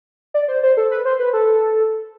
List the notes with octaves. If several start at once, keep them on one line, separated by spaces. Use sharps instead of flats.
D5
C5
C5
A4
B4
C5
B4
A4